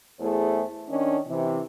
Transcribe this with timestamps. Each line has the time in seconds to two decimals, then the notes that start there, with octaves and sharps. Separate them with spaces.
0.20 E2 A3 E4 G#4 C5
0.89 D#3 C#4 D4
1.28 C3 E3